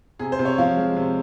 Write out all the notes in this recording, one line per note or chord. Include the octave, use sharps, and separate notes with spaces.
C3 G#4
C5
C3
C#5
F3 F5
G#3
C3